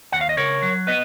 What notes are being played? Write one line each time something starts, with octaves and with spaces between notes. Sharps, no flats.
D#2 F#5
F5
D#5
C#3 A#4 C#5
F#3
B3 B4 D#5